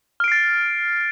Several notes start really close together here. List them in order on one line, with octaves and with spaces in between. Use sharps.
F6 D7 C7 A6